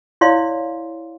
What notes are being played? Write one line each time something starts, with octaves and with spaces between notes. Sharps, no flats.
E4 C#5 D5 F5 C6